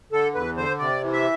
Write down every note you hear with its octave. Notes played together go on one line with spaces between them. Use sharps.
D3 A4
E2 B4
D3 C5
C3 D5
E3
E5